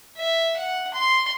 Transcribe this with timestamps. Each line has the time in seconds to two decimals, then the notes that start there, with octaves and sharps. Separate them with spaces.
0.17 E5
0.57 F#5
0.94 C6